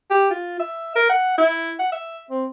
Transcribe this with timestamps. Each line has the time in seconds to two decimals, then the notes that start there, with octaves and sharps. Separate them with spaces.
0.10 G4
0.30 F4
0.60 E5
0.95 A#4
1.10 F#5
1.38 E4
1.79 F#5
1.92 E5
2.30 C4